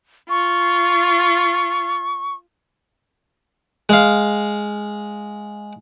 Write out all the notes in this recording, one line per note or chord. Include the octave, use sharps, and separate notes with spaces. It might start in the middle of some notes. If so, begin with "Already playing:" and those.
F4 C#6
G#3 F5